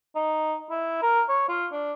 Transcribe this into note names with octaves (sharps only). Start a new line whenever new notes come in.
D#4
E4
A#4
C#5
F4
D4